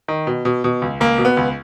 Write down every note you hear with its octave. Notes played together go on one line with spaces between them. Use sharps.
D#3
B2
B2
B2
C#2
C#2 A#3
B2
B3
C#2